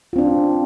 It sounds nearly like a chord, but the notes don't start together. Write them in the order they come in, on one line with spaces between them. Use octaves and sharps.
F4 C4 D4